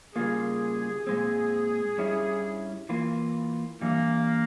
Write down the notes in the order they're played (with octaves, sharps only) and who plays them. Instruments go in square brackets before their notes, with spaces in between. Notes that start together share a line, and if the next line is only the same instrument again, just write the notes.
[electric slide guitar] C#3 G3 A#3 F4 [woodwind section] G#4
[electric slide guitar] A#2 G#3 C4
G2 G3 C#4 E4
E3 A#3 F4
[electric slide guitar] G2 E3 G3 [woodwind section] A#3